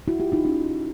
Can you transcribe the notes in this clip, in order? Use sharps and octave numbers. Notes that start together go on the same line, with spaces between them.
E4 F#4
F4 G4
D#4 F4
C#4 D#4